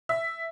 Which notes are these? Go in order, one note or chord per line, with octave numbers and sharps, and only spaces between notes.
E5